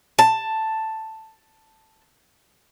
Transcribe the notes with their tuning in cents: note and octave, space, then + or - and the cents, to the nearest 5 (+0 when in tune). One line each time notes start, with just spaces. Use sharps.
A5 +5